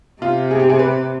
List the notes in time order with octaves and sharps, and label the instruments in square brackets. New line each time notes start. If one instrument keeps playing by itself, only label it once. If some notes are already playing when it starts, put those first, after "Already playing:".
[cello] C3 [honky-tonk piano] F4
[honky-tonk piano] G#4
G4
G#4
B4